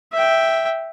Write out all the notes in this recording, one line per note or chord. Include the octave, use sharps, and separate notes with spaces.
E5 G5